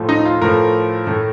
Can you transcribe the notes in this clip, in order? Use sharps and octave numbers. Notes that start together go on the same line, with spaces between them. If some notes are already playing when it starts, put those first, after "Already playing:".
Already playing: A2 F3 A3
D#4
F4
A2 F3 A3 A#4
A2 A3